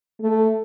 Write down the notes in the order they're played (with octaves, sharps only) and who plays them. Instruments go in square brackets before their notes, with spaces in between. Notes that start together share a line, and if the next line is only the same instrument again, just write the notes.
[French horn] A3